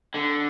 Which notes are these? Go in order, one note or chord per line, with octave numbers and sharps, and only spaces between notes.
D3